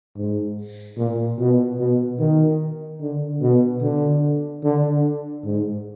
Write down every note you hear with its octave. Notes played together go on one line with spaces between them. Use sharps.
G#2
A#2
B2
B2
D#3
D3
B2
D3
D3
G#2